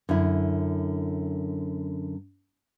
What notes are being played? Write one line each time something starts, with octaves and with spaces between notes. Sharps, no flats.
F#2 D3 E4